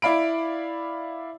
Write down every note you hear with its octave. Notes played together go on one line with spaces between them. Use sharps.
E4 D5 F5 B5 D7